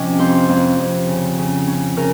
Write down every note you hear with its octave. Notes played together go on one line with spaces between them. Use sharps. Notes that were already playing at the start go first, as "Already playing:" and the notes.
Already playing: C3 F3 C#4 D#5
F2 C5
F2
F2
C#3
C#3
C#4
C#3 A#4